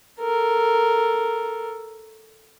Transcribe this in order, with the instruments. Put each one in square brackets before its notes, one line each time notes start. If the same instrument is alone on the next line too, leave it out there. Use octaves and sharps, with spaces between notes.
[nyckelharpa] A4 A#4